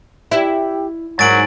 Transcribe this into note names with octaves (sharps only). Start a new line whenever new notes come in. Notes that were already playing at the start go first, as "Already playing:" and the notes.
E4 G4
G#2 F#3 A#4 A6 D7 F#7